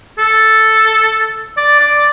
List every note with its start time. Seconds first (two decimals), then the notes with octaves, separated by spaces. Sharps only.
0.18 A4
1.57 D5
1.79 D5